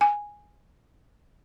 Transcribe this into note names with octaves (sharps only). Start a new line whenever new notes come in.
G#5